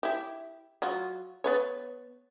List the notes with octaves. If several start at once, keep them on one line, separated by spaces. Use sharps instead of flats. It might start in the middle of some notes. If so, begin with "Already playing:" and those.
E4 G4
F#3 F4 F#4
B3 B4 C#5